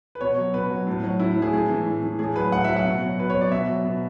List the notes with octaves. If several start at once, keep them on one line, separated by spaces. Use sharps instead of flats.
B4
B2 C#5
F#3
B2 B4
F#3
A2
F#3
A2 E4
F#3
G#4
A2 G#4
E3
A2
E3
A2 G#4
F#3 B4
A2 F#5
F#3 E5
F#5
B2
F#3
B2 B4
C#5
F#3
D5
B2 E5
F#3
B2